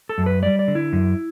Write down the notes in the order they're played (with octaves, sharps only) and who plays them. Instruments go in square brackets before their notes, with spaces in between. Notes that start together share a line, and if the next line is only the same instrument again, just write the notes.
[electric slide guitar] A4
F#2
B4
G3 D5
D5
D3
E4
F#2